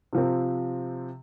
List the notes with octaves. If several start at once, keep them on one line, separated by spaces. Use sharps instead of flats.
C3 F3 C4